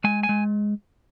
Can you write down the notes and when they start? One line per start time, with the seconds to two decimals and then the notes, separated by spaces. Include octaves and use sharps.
0.04 G#3 G#5
0.23 G#5
0.29 G#3